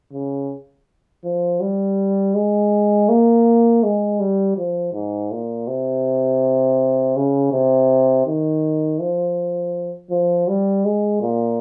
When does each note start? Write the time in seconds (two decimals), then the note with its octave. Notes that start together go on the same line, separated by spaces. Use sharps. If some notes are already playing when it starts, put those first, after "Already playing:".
0.13 C#3
1.24 F3
1.61 G3
2.35 G#3
3.09 A#3
3.83 G#3
4.20 G3
4.57 F3
4.93 G#2
5.31 A#2
5.67 C3
7.16 C#3
7.52 C3
8.26 D#3
9.00 F3
10.10 F3
10.48 G3
10.85 G#3
11.21 A#2